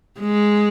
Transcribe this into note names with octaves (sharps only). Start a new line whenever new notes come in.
G#3